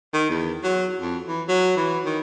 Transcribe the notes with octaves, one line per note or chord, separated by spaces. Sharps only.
D#3
E2
F#3
F2
E3
F#3
E3
D#3